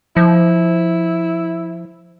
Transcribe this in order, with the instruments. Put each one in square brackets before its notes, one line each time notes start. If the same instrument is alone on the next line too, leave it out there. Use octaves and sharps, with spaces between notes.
[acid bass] F3 [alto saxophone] E4